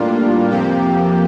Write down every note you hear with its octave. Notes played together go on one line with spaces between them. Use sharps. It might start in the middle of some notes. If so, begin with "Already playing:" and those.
Already playing: A2 G3 A#3 D4 F4
F2 C3 F3 A#3 G4